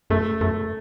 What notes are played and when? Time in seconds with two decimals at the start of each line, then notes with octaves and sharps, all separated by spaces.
0.10 F#2 A3
0.41 F#2 A3